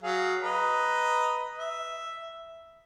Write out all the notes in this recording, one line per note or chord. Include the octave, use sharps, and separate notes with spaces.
F#3 G#4 F5
B4 D#5 A#5
E5